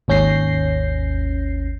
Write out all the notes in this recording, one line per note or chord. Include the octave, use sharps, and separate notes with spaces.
G#1 D#2 C#4 G6 A#6 C7